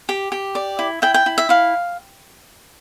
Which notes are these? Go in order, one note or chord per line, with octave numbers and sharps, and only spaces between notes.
G4
G4
D5
E4
E4 G5
G5
E4
E5
E4 F5